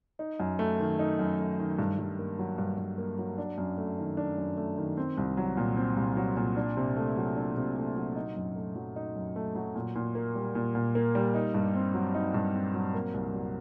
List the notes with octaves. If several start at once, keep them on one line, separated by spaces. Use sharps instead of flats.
D#4
F#2
A3
D#3
D#4
F#2
A3
D#3
G2
G2
A#3
F#3
G2
G2
A#3
F#3
D4
F#2
A3
D#3
D4
F#2
A3
D#3
C4
C2
F#3
A#2
C4
C2
F#3
A#2
D4
C3
A3
F#3
D4
C3
A3
F#3
D#4
F#2
A3
F#3
D#4
F#2
A3
F#3
A#2
A#2
A#3
G3
A#2
A#2
A#3
G3
D#4
G2
C4
F#3
D#4
G2
C4
F#3
A#3
C2
F#3